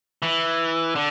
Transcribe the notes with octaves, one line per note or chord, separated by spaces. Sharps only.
E3
D3